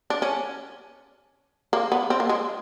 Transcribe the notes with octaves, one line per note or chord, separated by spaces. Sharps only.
D4
C#4
A#3
B3
C4
A#3
G#3